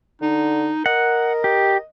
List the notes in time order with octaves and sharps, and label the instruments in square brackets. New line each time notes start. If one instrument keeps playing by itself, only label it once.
[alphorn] D3 [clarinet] D#4
[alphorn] A#4 [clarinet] D#5 [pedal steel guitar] F#5
[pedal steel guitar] G4